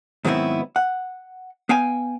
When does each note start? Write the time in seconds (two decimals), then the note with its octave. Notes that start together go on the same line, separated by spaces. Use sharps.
0.25 G#2 D#3 F#3 B3 C4 E4
0.76 F#5
1.69 B3 F5 G5 G#5